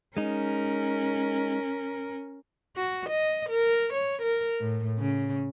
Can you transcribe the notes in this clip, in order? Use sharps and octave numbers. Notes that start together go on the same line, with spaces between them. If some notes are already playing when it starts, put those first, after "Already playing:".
G#3 C#4 D#4 A#4
F#4
D#5
A#4
C#5
A#4
A2
C#3